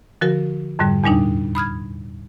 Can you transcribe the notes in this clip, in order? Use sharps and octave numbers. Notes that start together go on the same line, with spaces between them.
D3 F3 F#4 A#4
F2 G#2 D3 G3
E2 A#2 G3 D4 D#4
B5 D#6 F6 G#6